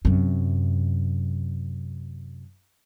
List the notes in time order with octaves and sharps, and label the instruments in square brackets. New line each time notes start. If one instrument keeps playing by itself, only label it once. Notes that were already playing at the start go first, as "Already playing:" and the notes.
[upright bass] F#2 C3